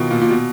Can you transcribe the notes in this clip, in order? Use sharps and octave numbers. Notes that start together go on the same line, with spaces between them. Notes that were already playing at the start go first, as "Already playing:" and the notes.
Already playing: B2 D#3 F3
A#2
A#2
B2